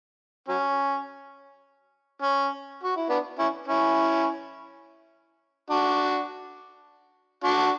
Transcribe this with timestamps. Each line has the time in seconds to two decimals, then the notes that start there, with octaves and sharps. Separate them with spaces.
0.49 F#3 C#4
2.22 C#4
2.83 F#4
2.96 E4
3.09 B3 D4
3.39 C#4 E4
3.67 C#4 E4
5.70 D4 F#4
7.44 D4 F#4